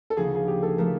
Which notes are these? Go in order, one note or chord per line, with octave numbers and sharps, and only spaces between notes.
A4
D2 C#3 F3 A#3 D#4 G#4
G#4
G4
A4
F3 A3 A#4